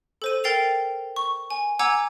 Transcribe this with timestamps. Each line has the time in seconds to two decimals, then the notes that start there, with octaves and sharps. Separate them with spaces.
0.22 A4 C5 D#7
0.44 A#4 G5 A6 C7 F7
1.16 C#6
1.50 G#5
1.79 F#5 G#5 A#5 D6 E6 G#6